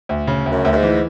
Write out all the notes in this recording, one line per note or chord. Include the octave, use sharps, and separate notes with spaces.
D2
C#3
D2
F#2
D2
F#2
G#2
E3